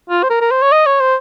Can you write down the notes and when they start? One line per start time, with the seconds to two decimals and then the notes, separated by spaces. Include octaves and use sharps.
0.10 F4
0.23 C5
0.30 A#4
0.41 A#4
0.51 C5
0.62 C#5
0.72 D#5
0.86 C#5
1.01 C5